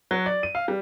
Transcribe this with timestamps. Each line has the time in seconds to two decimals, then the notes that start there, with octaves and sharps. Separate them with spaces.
0.11 F#3
0.26 D5
0.43 D#7
0.55 F5
0.68 G3